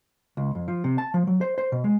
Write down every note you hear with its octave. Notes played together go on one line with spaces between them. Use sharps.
C#2
F2
F3
C3
A5
F3
F#3
C5
C5
B2
G#3